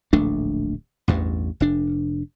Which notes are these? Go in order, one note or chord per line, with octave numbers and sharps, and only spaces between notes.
D1 A#1 A3 D4
A1 E2 G2
F1 D4